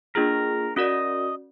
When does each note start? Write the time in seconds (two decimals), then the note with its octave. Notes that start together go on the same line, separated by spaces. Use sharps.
0.15 A#3 D4 F4 G#4 A#4
0.76 C#4 F#4 A#4 D5 D#5